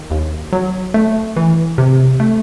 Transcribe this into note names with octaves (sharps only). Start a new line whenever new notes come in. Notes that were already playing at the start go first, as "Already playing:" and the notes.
Already playing: D#3
D#2
F#3
A3
E3
C3
A3